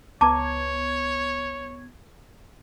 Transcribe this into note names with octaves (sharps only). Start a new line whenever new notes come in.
C#2 B3 C#5 A5 A#5 D6 G#6